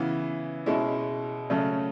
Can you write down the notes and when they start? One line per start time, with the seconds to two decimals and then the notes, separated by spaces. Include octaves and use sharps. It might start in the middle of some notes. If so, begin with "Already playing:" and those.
Already playing: C#3 E3 B3
0.66 B2 G#3 C#4 E4
1.50 C#3 F#3 A3 C#4